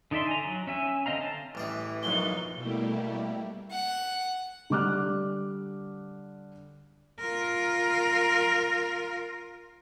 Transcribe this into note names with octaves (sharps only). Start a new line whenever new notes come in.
D3 D#4 D5 E5 C6
G#5 A#5
F#3
C#4 E5 G#5
D3 C4 D#5 F5 A#5
A5
A1 E3 G3 G#4
B1 F#2 F3 G#3 A#3 D#4 G7
B2 G3 A3 A#3 E4 G4
F#5
D3 G3 D6 F6 F#6
F4 A#4